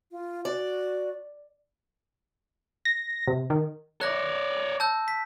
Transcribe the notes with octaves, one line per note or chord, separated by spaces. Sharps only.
F4
F#4 D5
A#6
C3
D#3
C#5 D5 F#6 A#6
A5 E6 G6
B6